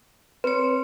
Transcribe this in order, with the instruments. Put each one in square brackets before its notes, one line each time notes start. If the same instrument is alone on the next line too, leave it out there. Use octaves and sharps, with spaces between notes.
[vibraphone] C4 C#5 [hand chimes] B4